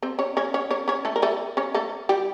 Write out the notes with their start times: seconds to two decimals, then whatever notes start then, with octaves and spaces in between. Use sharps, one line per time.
0.03 C4 C5
0.19 C#4 C#5
0.37 C#4 C#5
0.54 C#4 C#5
0.71 C#4 C#5
0.88 C#4 C#5
1.05 A3 A4
1.16 A#4
1.22 A3 A4
1.57 C#4 C#5
1.74 A3 A4
2.09 G3 G4